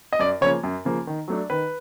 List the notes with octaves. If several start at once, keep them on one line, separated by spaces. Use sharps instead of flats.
D#5
F#2 D5
C#3 F3 A#3 C#5
F#2
C#3 F3 A#3
D#3
F#3 A3 D4
D#3 B4